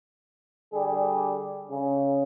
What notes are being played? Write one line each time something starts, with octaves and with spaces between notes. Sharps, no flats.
D3 G3 G#4
C#3